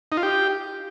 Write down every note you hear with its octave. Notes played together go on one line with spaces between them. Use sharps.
D#4
F4
G4